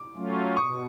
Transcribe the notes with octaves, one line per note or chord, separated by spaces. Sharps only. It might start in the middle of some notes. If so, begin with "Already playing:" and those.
Already playing: D6
F#3 A3 C#4 F4
B2 C#6 D#6